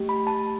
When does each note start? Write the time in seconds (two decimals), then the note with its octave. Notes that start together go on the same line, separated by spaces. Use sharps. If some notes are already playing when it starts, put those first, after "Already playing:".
Already playing: A3 G4
0.09 B5
0.27 A5